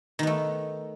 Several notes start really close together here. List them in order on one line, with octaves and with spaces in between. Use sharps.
D#3 B3 A3